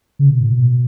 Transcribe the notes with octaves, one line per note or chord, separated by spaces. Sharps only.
C#3
B2
A2
B2